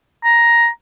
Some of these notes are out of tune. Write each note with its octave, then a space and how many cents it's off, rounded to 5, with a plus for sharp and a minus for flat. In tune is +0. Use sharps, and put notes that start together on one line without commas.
A#5 +10